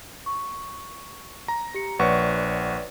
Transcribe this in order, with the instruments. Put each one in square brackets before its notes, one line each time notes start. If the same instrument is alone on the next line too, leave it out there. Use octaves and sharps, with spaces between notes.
[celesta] C#6
[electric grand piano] A#5
[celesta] G4 C#7
[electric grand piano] A#1 F#5 C#6 [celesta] B4 C#5 D5